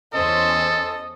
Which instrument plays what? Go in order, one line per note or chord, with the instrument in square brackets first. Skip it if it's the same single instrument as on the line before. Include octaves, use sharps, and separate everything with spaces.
[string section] E2 C#4 C5 [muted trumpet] A4 [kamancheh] D#5